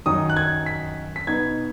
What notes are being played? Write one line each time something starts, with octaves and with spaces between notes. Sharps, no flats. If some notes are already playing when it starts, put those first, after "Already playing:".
F#2 D#3 F#3 D#4 D#6
F#6
G#6
B6
B6
B2 B3 D#4 G#6